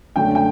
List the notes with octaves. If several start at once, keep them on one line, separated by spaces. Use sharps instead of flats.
F#2 D3 A3 G5
G5